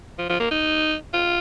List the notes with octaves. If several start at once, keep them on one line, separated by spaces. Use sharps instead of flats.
F3
F3
A#3
D#4
F4